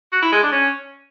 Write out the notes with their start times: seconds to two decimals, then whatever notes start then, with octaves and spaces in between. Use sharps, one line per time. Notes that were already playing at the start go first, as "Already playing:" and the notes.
0.12 F#4
0.22 E4
0.32 G#3
0.42 D4
0.52 C#4